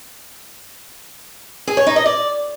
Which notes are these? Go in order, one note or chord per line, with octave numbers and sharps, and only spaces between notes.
G#4
C#5
D#4
D#5
D5